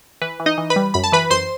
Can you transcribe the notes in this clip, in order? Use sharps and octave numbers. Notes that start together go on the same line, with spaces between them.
E3 B4
E3
D#4 D#5
E3
B4 B5
G3
F#2 B5
A5
E3 B4 B5
F#2 C5 C6